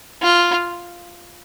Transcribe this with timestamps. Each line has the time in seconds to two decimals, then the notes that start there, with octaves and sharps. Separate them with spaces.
0.22 F4